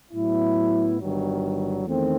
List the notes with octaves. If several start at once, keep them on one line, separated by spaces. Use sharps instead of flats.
A2 F#3 B3 E4
G1 G2 D#3 F#3
E2 D#3 A3 C4